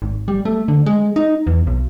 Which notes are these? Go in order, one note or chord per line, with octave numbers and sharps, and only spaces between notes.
G#1
G3
A3
D3
G#3
D#4
E2
B1